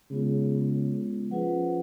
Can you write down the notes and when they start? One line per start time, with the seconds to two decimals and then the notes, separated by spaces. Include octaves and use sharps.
0.11 C#3 G#3 B3 F4
1.31 F3 C#4 F4 G#4 B4 F#5